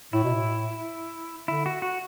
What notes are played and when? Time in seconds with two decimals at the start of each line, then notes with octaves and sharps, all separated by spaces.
0.13 A2 E4
0.24 B2
0.34 A2
1.48 D3 E4
1.66 F#4
1.82 F#4